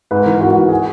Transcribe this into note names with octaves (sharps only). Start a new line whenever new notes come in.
G#2 B4
E3 A#4
G#2 F#4
E3 F#4
G#4